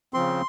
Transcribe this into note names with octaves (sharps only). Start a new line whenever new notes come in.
C#3 F3 C4 C6